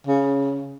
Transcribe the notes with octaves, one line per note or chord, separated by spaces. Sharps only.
C#3